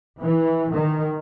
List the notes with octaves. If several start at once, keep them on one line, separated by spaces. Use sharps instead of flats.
E3
D#3